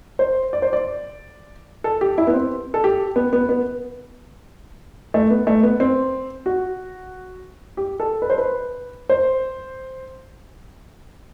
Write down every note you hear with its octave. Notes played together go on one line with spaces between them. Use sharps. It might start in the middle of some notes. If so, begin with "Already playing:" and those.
C5
D5
C5
D5
A4
G4
E4
B3
C4
A4
G4
B3
B3
B3
A3
B3
A3
B3
C4
F#4
G4
A4
B4
C5
B4
C5